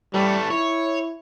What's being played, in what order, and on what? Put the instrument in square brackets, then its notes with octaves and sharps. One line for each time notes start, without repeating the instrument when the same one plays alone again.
[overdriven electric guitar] E3 A3 [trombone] G3
[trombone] E4 [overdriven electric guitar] C#5